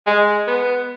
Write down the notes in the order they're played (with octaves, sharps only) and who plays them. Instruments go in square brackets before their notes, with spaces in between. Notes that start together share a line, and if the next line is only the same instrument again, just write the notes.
[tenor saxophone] G#3
B3